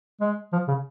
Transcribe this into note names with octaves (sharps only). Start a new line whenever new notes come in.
G#3
F3
C#3